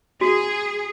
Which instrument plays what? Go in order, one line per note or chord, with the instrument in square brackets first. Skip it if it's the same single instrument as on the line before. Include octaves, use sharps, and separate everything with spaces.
[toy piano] F#4 [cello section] G#4